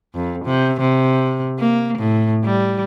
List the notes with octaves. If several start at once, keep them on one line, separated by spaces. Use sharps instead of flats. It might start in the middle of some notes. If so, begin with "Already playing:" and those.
F2
C3
C3
A#3
A2
G3